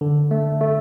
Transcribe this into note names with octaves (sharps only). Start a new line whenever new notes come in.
D3
A3
A3